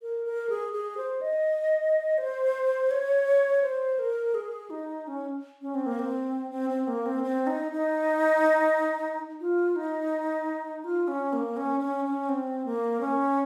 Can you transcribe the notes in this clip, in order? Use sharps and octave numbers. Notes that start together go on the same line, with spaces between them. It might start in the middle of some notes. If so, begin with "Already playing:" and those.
A#4
A#4
G#4
G#4
C5
D#5
C5
C#5
C5
A#4
G#4
D#4
C#4
C#4
C4
A#3
C4
C4
C4
A#3
C4
C4
D#4
D#4
F4
D#4
F4
C#4
A#3
C#4
C#4
C#4
C4
A#3
C#4